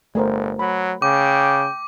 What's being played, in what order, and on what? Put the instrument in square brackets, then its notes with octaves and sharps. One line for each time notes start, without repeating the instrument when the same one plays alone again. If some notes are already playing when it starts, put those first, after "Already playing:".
[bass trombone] G1 [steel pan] A3 A#4 C5
[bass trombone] F#3 [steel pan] B5
[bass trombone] C#3 [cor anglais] G5 [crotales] D6